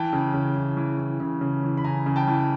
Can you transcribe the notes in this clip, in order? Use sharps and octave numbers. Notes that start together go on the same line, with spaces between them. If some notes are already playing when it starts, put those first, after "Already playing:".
Already playing: E3 G5 A5
C#3
C#3
E3
E3
E3
C#3
C#3
E3
B5
C#3 G#5 A#5
C#3
G5 A5
E3